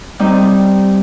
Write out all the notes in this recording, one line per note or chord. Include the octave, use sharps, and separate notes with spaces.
G3 C4 D#4